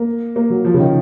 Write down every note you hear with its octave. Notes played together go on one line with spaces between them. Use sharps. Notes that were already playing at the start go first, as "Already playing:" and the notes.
Already playing: A#3
A#3
F#3
F3
C#3
D#3